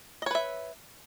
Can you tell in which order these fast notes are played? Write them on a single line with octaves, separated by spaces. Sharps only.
D#5 C#5 B4 E5